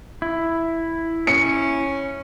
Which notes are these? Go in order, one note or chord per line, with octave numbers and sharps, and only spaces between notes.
E4
C#4 C#7